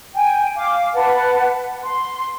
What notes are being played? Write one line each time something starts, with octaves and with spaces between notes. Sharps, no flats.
G5 G#5
F5 D6
B4 F#5 A5
C6